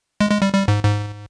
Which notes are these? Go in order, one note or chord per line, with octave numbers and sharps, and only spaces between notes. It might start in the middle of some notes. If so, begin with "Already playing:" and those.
G#3
G#3
G3
G3
G#2
G#2